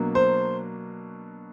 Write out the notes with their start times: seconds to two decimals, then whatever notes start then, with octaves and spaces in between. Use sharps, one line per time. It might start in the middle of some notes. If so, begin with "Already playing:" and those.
Already playing: B2 F#3 A#3 D4
0.15 C5